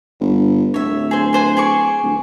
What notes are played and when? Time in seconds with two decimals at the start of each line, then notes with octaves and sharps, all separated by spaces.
0.20 G1
0.74 D1 C#5 E5
1.11 G#4 C5
1.33 B4 C5 G#5
1.57 G#4 D5 C#6
2.03 D1